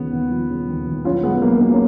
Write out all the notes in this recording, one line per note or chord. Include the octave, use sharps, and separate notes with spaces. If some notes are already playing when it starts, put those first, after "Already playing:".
Already playing: D#2 C#3 F3 B3
D#2
F3
C#3
D#2
D#2
B1 C#4 F4
B2 G#3 B3
B1 A#3
B2 A#3
C#4